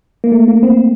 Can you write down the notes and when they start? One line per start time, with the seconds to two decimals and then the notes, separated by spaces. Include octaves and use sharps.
0.24 A#3
0.32 A3
0.48 A#3
0.63 C4